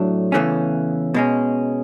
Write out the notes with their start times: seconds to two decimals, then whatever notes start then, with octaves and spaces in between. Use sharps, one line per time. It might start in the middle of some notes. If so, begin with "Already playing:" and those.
Already playing: A2 F#3 A3 D4
0.32 E2 C#3 E3 A3 C#4
1.14 B2 G#3 C#4